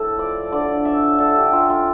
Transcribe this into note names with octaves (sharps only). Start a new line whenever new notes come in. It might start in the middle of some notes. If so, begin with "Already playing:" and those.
Already playing: A2 A4
F3 D5
D3 D5
C#4 E5
D3 A4
G4
C#4 F4
F4